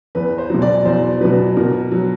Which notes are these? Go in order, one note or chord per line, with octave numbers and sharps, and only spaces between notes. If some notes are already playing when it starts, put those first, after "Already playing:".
E2 B4
C5
B2 F#3
D5
E2 C5
B2 F#3 B4
B2 A#4
F#3